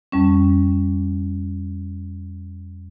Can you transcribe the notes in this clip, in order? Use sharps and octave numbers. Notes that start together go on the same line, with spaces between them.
F2 G3 C#4